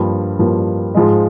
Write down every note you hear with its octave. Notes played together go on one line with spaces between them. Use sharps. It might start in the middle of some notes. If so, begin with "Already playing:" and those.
Already playing: G2 F3 A#3
G2 F3 A#3
G#2 F3 G#3